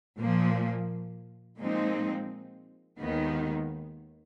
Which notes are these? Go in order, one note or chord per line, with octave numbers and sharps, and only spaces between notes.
A#2 F3 A#3
A#2 F3 G#3 C4 D#4
D#2 D#3 G#3 B3 D#4